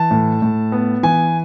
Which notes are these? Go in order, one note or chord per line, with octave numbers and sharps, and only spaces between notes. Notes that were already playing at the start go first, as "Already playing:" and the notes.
Already playing: E3 A5
A2
A2
B3
E3 G#5